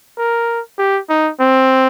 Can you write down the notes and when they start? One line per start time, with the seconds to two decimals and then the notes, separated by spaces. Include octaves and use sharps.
0.18 A#4
0.79 G4
1.10 D#4
1.40 C4